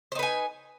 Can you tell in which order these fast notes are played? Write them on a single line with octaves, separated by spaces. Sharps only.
C5 D#4 B4 G#5